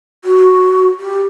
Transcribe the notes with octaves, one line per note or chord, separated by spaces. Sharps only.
F#4
G4